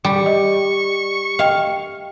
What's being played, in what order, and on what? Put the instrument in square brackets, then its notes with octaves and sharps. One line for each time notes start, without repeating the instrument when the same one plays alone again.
[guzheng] G3 [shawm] C#6
[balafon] D#5
[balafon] D#5 G5 [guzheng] F5